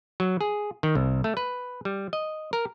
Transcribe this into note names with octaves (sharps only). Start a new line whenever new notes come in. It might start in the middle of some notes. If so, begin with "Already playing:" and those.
F#3
G#4
D#3
C2
A3
B4
G3
D#5
A#4